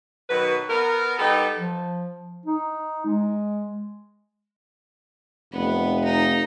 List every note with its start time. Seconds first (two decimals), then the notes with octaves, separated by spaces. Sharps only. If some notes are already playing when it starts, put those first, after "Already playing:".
0.30 B2 D#3 F#3 B4
0.69 B3 A#4
1.19 G3 B3 D#4 G4 A4
1.57 F3
2.46 D#4
3.06 G#3
5.53 F1 B3
6.04 D#4